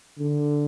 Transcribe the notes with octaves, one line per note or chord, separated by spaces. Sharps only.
D3